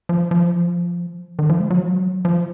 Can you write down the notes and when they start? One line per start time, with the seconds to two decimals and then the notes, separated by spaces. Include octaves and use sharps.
0.09 F3
0.31 F3
1.39 D#3
1.49 F3
1.60 G#3
1.70 F#3
2.25 F3